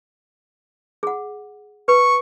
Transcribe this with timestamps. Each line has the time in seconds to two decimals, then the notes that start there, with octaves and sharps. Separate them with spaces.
1.03 G#4 F#5
1.88 B4 C#6